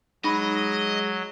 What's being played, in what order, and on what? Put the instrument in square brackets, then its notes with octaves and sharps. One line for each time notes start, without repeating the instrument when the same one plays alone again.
[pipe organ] F#3 [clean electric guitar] G#3 [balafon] D#4 B5 [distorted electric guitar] D#5